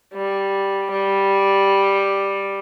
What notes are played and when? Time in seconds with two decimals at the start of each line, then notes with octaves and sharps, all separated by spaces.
0.13 G3
0.92 G3